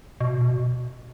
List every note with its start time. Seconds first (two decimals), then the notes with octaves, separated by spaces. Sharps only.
0.21 B2
0.41 B2